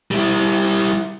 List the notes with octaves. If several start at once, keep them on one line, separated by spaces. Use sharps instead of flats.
G3 E4